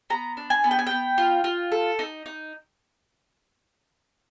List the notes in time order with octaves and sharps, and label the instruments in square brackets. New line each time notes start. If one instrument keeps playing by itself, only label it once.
[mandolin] B3 A#5
D4
G#5
B3
G5
G#5
B3 G5
F4
F4
A4
D#4
D#4